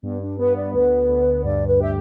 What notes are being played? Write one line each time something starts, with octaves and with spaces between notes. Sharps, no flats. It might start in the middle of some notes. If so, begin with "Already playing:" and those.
G2 B3
D4
B3 B4
D5
D2 B4
D2
G2 D5
B4
G4 E5